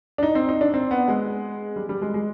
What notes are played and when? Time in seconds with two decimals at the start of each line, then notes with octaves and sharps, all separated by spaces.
0.18 D4
0.23 D#4
0.35 C4
0.49 D#4
0.61 D4
0.74 C4
0.91 B3
1.08 G#3
1.76 G3
1.89 G3
2.02 G#3
2.14 G#3